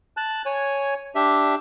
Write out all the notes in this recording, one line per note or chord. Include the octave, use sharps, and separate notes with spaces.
A5 F#6
C#5 G#5
D4 G4 E5